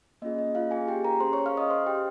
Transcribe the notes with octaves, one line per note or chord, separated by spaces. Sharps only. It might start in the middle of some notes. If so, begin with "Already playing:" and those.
A#3 C#4 F4 G#4 D#5
D#5
F4 F5
G#4 G#5
G4 G5
A#4 A#5
C#4 G#4 C5 C6
C#5 C#6
F5 F6
D#5 D#6
C5 C6
G4 G5